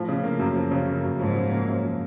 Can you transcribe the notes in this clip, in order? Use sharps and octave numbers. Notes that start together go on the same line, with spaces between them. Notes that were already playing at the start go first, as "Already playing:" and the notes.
Already playing: A2 F3
C#3
A#3
F#2
F3
C#3
A#3
F#2
G#2 F3
C#3
A#3
F#2
F3